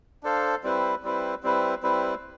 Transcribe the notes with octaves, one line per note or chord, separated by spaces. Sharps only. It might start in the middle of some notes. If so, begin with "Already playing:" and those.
D4 A4 C5 F5
G3 C4 E4 B4
G3 C4 E4 B4
G3 C4 E4 B4
G3 C4 E4 B4